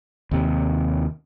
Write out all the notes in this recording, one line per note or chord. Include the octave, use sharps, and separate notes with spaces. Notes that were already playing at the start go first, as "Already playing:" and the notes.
D#2 C3